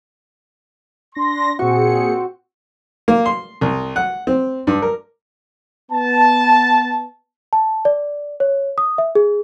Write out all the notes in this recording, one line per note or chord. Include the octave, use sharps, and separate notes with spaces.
D4 C6 A#6
A#2 C4 F#4 G#4 C#7
A#3
C6
C2
F#5
C4
G2
A#4
B3 A5
A5
D5
C#5
D#6
E5
G#4